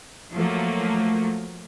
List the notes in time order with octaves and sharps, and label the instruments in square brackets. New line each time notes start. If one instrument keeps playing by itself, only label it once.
[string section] F3 F#3 A3 A#3